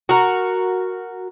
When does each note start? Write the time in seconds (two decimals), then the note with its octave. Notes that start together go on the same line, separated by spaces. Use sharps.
0.09 F#4 A#4